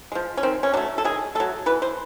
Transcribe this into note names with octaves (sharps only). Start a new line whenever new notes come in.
F3 G#3
C#4
D#3 C4
C#4
F#3 A3 D4
A4
D#3 G#4
F#3 A3 A4
E3 B4
C5